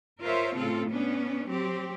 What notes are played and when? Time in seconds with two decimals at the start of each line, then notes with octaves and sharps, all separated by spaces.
0.21 F4 A#4 C5 C#5 E5
0.57 A2 C#3 C4 F4 A4
0.91 B3 C#4 D4
1.49 F#3 C4 G4